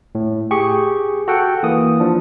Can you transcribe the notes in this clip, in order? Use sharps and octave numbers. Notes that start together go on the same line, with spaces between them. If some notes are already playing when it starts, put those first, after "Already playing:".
A2
G4 G#4 C#6
F#4 A4 F#5 G5
E3 A#3 D#6
F3 D4